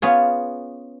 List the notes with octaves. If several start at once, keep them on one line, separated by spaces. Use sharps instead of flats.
B3 C#4 F4 G#4 C#5